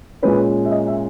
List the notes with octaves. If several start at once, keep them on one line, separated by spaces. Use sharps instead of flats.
A#2 G#3 C#4 B4
E5
D#5
E5